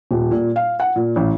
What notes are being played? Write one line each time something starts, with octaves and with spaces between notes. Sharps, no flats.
D#1
A#2
F5
F#5
A#2
A1